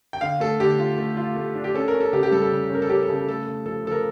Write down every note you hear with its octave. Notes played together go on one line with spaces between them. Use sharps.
G5
D3 F5
A3 A4
D3 G4
F4
A3
F4
A3
D4
G4
C#4 A4
A#4
C#4
A4
C#3 G4
G4
G3 A4
A4
C#3
C#4 A#4
A4
C#4 G4
A4
C#3
A4
A3 A4
A3
F3 A4
F3 A4
A#4